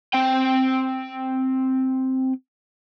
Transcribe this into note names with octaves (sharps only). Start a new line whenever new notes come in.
C4 G5